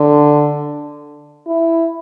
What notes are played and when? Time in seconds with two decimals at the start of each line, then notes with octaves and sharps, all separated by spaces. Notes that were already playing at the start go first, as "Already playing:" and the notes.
Already playing: D3
1.47 E4